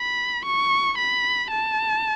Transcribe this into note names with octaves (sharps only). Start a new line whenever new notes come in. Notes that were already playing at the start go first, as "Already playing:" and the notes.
Already playing: B5
C#6
B5
A5